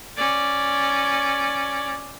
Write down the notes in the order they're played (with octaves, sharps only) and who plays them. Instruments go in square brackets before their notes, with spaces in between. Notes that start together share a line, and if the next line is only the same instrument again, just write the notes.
[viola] C#4 D5